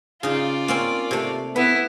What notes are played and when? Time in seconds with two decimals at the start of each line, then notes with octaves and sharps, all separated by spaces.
0.23 C#3 D#4 F4 D5
0.68 A#3 C4 C#4
1.11 C3 A3
1.56 B3 E4 B4